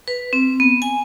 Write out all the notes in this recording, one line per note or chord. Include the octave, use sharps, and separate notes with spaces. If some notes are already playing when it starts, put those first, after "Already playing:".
B4
C4
B3
G#5